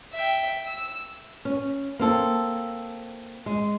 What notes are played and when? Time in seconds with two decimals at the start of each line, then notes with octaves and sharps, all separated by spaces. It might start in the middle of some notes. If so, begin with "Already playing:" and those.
0.13 E5 G5
0.65 E6
1.45 C#4
1.99 A#3 C4 A4
3.46 G#3